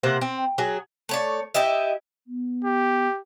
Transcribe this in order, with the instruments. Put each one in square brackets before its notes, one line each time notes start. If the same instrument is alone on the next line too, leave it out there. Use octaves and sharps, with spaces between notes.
[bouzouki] C3 A#3 C5 F#5
C4
F#3 G#4
A3 C#5 D5
E4 G4 D#5 E5
[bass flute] B3
[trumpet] G4